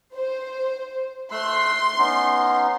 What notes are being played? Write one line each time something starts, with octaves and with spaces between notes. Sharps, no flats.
C5
A3 C6 E6 F#6
B3 C#4 D#4